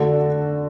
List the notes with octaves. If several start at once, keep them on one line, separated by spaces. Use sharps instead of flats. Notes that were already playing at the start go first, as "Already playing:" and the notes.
Already playing: D3 A3 D4 F#4 A4